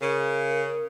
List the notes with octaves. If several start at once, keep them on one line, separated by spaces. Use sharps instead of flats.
C#3 A#4